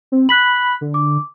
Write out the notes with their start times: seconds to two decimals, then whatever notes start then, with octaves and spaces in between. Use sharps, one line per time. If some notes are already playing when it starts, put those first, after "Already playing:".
0.12 C4
0.29 B5 F#6 B6 F#7
0.81 D3
0.94 D6